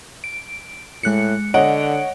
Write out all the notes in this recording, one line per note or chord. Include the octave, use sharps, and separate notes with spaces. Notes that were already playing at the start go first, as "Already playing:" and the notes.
D7
A2 G#3 F#6 C#7
D3 C#5 D#5 F#5 D7